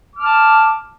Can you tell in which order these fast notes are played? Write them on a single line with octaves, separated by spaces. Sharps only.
D6 F6 A5